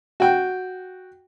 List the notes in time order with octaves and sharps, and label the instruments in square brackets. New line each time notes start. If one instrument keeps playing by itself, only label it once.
[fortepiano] F#4 G5